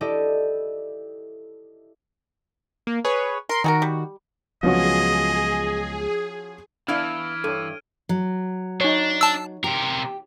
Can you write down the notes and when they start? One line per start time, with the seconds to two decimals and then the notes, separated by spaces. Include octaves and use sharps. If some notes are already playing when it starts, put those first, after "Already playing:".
0.01 E4 G4 A4 D5 D#5
2.87 A#3
3.05 G#4 B4 C#5
3.49 A#4 C6 C7
3.64 D#3 D#4 F#4 G#4 A#4
3.82 G3
4.63 C#2 F3 F#3 B3 C#4 F#4 G#4 D#5
6.88 E3 B3 D4 E4 F5 F6 G#6 D7
7.44 G2 A4 C#5 D#7
8.09 F#3
8.81 D4 D#4 C#5
9.21 A5 E6
9.64 C3 G4 A#4